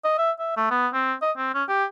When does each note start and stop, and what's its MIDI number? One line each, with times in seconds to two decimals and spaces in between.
0.04 0.14 75
0.18 0.31 76
0.39 0.53 76
0.57 0.69 57
0.70 0.88 59
0.94 1.14 60
1.22 1.31 75
1.37 1.52 60
1.54 1.63 61
1.69 1.84 67